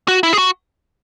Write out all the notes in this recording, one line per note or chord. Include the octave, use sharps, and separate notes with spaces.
F#4
E4
G#4
F#4